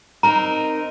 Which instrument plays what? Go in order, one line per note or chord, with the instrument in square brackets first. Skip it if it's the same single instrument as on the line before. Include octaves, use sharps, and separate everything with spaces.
[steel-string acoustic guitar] C4 D#4 A#4 [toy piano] A#5